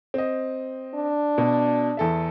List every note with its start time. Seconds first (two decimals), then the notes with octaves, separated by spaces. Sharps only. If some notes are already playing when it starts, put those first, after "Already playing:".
0.14 C4 D#5
0.94 D4
1.38 B2
1.97 E2 A4 E5